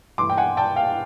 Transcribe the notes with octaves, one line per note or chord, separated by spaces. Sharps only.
G2 E3 A3 C6 D6
G5
F#5 G#5
G5 A5
F5 G5